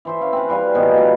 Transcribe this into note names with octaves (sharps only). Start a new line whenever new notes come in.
E3 C5 E5
C#4 F5
C4 B4
E3 G3 F5 G#5
G#2 B2 D#3 F3
A#2 G3